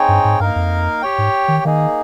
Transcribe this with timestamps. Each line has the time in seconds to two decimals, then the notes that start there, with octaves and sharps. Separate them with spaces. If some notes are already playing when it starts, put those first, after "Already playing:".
Already playing: C4 D#4 G#4 C#5 G5
0.09 G2
0.25 G#2
0.40 G2 A#3 D#4 A#4 F5
0.56 F2
1.02 G4 C#5 G5
1.18 G#2
1.48 D#3
1.64 D#3 A#3 D#4 G#4